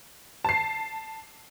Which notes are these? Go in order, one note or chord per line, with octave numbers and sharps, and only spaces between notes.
A5 C7